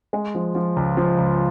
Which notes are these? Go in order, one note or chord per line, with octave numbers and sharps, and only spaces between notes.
G#3
F3
F3
C#2
F3
C#2